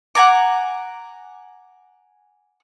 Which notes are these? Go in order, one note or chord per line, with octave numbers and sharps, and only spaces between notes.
F#5 G#5 A#5 D6